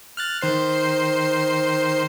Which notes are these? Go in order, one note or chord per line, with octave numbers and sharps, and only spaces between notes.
F6 F#6 A6
D#3 C5 C7